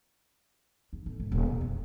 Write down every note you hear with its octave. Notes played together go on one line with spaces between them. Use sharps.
E2
A1
G#1
D#1
B2
F2